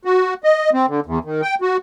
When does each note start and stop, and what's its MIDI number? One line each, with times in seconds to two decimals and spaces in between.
0.05 0.34 66
0.44 0.70 75
0.73 0.86 60
0.88 1.00 50
1.06 1.19 40
1.24 1.41 51
1.42 1.55 79
1.62 1.77 66